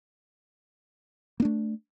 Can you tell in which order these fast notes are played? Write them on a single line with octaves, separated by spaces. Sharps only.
A#3 D4 A3